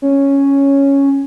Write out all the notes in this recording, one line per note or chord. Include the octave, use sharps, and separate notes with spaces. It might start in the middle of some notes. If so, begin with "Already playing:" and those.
C#4